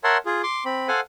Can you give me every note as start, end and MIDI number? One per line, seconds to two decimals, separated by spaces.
0.04 0.17 70
0.04 0.17 73
0.04 0.17 76
0.04 0.17 78
0.04 0.17 81
0.04 0.17 84
0.26 0.42 65
0.26 0.42 68
0.43 0.64 84
0.43 0.64 86
0.65 0.88 60
0.65 0.88 83
0.88 1.00 69
0.88 1.00 72
0.88 1.00 77
0.88 1.00 78
0.88 1.00 80